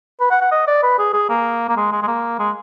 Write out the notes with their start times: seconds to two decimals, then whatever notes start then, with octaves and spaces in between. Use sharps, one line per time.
0.20 B4
0.31 F#5
0.41 F#5
0.52 D#5
0.67 D5
0.83 B4
0.99 G#4
1.13 G#4
1.29 A#3
1.69 A#3
1.77 G#3
1.92 G#3
2.02 G#3
2.07 A#3
2.39 G#3